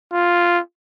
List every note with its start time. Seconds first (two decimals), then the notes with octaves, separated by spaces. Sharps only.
0.13 F4